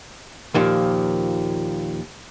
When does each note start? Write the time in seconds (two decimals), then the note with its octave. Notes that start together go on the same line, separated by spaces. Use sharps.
0.54 D#2 A#2 F3